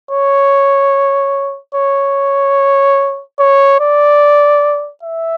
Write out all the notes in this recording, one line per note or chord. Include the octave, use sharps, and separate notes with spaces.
C#5
C#5
C#5
D5
E5